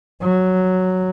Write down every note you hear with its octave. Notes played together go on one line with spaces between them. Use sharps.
F#3